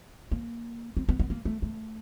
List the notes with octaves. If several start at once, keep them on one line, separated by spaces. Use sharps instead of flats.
A#3
C4
B3
B3
A#3
A3
A3